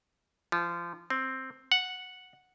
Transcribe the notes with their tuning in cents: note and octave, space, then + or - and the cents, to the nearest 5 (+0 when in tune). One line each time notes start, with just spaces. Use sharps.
F3 -25
C4 +5
F#5 -5